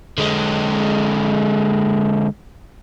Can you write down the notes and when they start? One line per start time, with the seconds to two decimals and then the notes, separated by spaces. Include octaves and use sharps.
0.18 D3 G#3